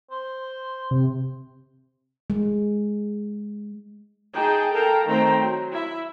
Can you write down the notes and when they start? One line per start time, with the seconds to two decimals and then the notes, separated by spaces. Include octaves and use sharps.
0.11 C5
0.91 C3
2.30 G#3
4.34 D#4 G#4 G5 A5
4.73 A4 A#4 F5 G5 A5 A#5
5.07 D#3 A3 C4 C5 G5 A#5
5.38 F#3
5.72 E4 E5